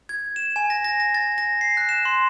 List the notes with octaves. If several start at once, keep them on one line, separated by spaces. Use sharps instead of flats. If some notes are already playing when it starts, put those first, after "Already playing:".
G#6
E7
G#5
A#6
A#6
A#6
A6
A#6
C7
F#6
E7
C6